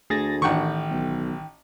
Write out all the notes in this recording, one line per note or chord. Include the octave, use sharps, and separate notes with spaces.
D2 A3 G#4 A6 A#6
A1 D#3 F#5 G5 C#6
B1